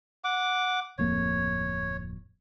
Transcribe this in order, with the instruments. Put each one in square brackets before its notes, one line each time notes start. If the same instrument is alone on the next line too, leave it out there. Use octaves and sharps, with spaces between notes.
[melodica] F#5 D6
[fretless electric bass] D1 F2 A#3 [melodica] C#5